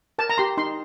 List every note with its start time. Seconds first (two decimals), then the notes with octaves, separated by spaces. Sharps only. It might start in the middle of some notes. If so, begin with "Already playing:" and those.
0.19 A#4 A5
0.30 A#5
0.38 G4 C6
0.57 D#4 C6